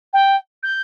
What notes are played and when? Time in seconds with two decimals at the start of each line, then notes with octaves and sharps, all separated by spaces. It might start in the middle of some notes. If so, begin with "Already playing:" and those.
0.13 G5
0.63 G6